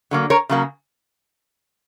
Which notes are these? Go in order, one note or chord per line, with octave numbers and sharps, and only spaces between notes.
D3 F#3 A#3
A#4 C#5
C#3 F#3 A#3